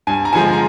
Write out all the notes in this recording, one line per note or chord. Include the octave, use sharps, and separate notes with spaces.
G2 G#5
A#5
D3 F3 G#3 G#5
A#5